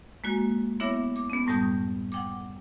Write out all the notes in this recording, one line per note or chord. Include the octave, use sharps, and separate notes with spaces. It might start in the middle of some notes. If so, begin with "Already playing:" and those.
G#3 A#3 F#4
B3 E4 C#5 E5 D6 A#6
D6
B3 C#4
F#2 A2 G3 A5 D#6 G6
F#5 G5 D6